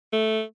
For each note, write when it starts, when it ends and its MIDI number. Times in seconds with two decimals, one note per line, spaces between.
0.13 0.42 57